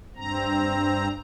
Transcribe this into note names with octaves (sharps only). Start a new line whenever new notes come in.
G2 C4 A#5